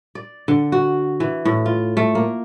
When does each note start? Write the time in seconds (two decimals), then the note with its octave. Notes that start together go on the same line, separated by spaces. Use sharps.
0.15 D5
0.48 D3
0.72 F#4
1.20 E3
1.45 A2
1.66 F4
1.97 A3
2.15 A#3